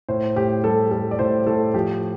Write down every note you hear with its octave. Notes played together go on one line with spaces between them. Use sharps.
A2 C5
A2 G4
G3 A4
G3 A4
D5
A2 C5
A2 A4
F3 G4